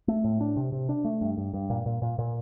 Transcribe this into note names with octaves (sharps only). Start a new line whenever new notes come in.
A3
A2
D4
C3
C3
D4
A3
G2
G2
G2
A#2
A#2
A#2
A#2